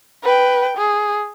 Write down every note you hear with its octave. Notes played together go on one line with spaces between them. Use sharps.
B4 G5
G#4